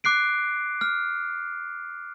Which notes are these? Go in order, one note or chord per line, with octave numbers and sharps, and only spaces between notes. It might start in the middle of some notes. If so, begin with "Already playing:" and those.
D6 F#6 C7 D7
F6